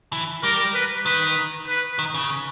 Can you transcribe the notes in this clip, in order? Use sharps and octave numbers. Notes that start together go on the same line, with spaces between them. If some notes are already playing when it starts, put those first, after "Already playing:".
E3
G3 A#4
B4
D#3 B4
B4
D#3
C#3